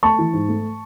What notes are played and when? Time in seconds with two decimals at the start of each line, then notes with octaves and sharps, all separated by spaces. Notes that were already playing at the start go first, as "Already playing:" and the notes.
0.03 A3 A5 C#6
0.18 E3
0.33 G#2
0.48 A3